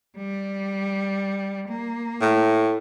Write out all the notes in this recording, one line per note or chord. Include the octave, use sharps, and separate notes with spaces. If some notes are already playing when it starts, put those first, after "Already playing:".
G3
A#3
A2